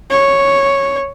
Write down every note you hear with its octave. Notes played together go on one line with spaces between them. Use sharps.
C#5